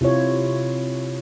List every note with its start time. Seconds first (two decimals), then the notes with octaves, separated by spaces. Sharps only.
0.01 C3 E4 F4 C#5